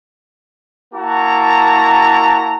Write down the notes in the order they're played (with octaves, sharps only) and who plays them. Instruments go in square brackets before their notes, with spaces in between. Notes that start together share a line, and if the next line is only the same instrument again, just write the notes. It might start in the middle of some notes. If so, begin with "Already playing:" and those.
[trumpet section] A#3 E4 F#4 A5 A#5